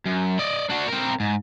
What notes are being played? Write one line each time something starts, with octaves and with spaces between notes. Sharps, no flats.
F#2
D5 D#5
D4 F#4
C4 A#4
G#2